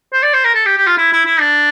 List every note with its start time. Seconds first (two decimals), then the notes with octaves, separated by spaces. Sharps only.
0.13 C5
0.23 D5
0.34 C5
0.45 A#4
0.54 A4
0.66 G4
0.77 G4
0.87 F4
0.98 E4
1.13 E4
1.26 E4
1.41 D4